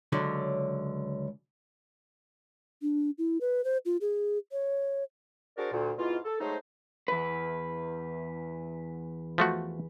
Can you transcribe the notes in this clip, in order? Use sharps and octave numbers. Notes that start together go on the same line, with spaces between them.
C#2 D3 F#3
D4
E4
B4
C5
F4
G#4
C#5
D4 F#4 G#4 A#4 C5 D5
D2 A#2
G#2 B2 E4 F4
A4
F#3 G#3 A3 D#4 C5
E2 B4
F3 A3 F#4